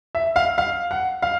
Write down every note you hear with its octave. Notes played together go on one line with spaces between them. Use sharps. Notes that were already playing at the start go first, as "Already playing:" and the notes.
E5
F5
F5
F#5
F5